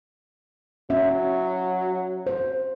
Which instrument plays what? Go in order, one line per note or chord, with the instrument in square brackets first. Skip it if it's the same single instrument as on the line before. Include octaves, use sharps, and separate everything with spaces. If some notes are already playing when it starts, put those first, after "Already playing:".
[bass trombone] F#3 [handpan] C#4 E5
[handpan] C5